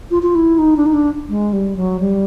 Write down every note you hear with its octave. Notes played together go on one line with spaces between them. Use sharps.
F4
F4
E4
D#4
D4
D#4
D4
G#3
G3
F#3
G3